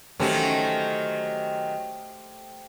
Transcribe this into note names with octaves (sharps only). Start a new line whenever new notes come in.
D#3 F#3 A3 C#4 G4 C5